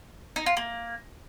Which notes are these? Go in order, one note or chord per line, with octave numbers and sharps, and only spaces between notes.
D#4
F4
A#3